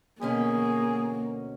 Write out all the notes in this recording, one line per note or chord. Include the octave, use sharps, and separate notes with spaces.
D2 B2 A#3 C#4 G#4